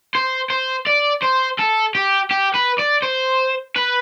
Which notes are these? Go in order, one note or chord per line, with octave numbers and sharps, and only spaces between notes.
C5
C5
D5
C5
A4
G4
G4
B4
D5
C5
B4